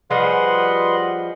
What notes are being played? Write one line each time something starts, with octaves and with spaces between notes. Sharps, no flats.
F3 G3 G#4 B4 D#5 F#5 C6